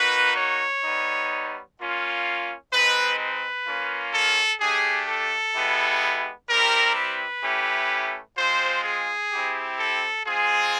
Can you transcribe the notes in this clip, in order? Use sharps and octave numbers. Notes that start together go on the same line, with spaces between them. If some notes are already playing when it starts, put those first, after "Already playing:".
Already playing: A#3 D#4 F#4 B4
C#5
G3 B3 D#4
A#3 C#4 F4
G#3 C4 D#4 B4
B4
A#3 C#4 F4
A4
A3 D4 G4 G#4
A4
G#3 B3 E4 G4
G3 C4 E4 G4 A#4
B4
A3 C#4 E4 G4
G#3 C4 F4 C5
G#4
C4 E4 G4
A4
G#3 C4 F4 G#4